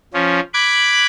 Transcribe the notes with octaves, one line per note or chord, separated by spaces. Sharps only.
F3 C#4
B5 D6 F#6 G#6